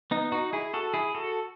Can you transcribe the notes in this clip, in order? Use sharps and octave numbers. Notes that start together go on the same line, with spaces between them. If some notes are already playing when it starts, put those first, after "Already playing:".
B3 D#4
D#4 F#4
E4 G#4
F#4 A4
E4 G#4
F#4 A4